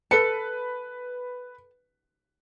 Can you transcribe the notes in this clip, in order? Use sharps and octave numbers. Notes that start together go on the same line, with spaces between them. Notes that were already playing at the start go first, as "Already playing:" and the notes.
A4 B4 A5 C#7